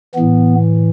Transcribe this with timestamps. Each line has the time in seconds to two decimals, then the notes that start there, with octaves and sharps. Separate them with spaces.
0.15 A2 E3 B3